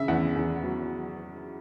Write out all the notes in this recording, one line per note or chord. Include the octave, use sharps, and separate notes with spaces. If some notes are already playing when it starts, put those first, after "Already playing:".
Already playing: C#3 E5
E2 F#5
E2
F#3